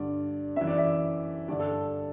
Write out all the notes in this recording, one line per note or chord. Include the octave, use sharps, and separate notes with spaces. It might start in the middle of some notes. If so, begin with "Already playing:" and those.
Already playing: G2 D3 D5
F#2 E3 E5
D5
E5
G2 D3 D5
A4